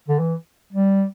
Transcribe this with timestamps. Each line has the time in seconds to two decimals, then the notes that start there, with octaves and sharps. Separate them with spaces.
0.08 D3
0.19 E3
0.73 G3